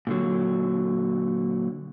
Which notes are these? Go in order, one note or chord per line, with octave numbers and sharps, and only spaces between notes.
A#2 D3 F#3